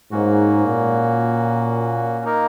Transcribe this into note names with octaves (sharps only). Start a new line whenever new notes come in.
G#2 A#3 C#4 F#4
A#2
A#3 D#4 A#4